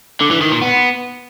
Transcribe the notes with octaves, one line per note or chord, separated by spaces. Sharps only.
D3
E3
D#3
A#2
B3